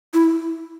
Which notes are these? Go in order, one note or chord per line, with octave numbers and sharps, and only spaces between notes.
E4